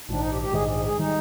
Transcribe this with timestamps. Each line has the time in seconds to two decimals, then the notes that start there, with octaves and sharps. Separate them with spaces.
0.09 A#1 G#2 D#3 D4
0.19 D#4
0.30 G4
0.42 G4
0.52 A#1 G#2 D#3 G#4
0.75 G#4
0.85 G#4
0.97 D#3 G3 D#4